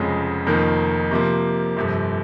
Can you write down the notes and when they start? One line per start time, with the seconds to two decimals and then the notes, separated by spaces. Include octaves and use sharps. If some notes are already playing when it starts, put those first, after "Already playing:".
Already playing: F1 F2 C#3 G#3
0.46 F1 F2 D#3 A#3
1.11 C3 F3 A#3
1.77 G1 F2 C3